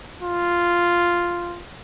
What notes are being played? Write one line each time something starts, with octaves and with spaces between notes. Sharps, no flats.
F4